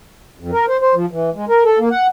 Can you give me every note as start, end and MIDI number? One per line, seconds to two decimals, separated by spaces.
0.40 0.51 41
0.52 0.66 70
0.68 0.77 72
0.82 0.95 72
0.95 1.06 53
1.11 1.30 52
1.35 1.45 56
1.49 1.64 70
1.65 1.79 69
1.79 1.89 58
1.91 2.07 78